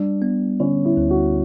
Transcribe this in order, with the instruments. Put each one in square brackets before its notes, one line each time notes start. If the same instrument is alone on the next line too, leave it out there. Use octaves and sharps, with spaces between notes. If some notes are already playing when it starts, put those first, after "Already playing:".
Already playing: [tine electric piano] G3 [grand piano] D4
[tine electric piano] B3
[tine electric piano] D3 [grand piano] C#4
[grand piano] E4
[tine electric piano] D2
[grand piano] F#4